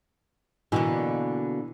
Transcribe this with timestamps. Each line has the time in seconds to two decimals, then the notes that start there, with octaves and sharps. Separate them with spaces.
0.72 B2 D3 E3 A#3